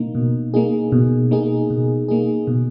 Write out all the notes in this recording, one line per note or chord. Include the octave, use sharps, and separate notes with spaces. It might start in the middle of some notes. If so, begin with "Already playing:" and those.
Already playing: B2 A#3 D#4
B2
A#3 D#4 G#4
B2
A#3 D#4 G#4
B2
A#3 D#4 G#4
B2